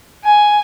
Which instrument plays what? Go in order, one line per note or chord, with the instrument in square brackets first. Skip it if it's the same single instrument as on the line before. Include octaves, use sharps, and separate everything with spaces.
[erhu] G#5